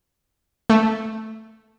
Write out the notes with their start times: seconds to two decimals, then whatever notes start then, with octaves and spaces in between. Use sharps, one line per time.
0.70 A3